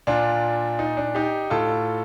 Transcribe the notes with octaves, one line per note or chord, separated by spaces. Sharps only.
A#2 D4 F4
D#4
D4
D#4 G4
A2 F4 A4